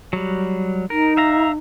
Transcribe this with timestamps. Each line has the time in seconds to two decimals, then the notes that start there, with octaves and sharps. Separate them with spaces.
0.13 F#3 G3
0.90 D#4 A#4
1.17 E5 F5 A#5